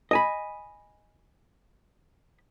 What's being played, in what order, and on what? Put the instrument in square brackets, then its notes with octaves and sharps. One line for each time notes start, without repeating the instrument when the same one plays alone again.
[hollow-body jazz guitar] D#5 G#5 B5